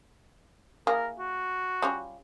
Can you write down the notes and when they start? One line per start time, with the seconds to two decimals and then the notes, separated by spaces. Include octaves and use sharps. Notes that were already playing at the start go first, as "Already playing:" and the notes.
0.87 A#3 E4 G#4 A#4
1.19 F#4
1.82 G3 C#4 F4